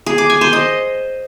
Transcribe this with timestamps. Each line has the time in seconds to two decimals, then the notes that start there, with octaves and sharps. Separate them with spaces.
0.06 G#4
0.18 D6
0.30 G#5
0.41 C5
0.53 D#5